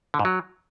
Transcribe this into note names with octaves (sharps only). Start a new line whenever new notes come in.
D3
G#2
F#3